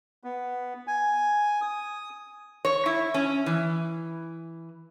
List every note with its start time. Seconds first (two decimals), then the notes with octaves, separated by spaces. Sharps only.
0.24 B3
0.87 G#5
1.61 D#6
2.65 C#5
2.86 E4
3.14 C#4
3.46 E3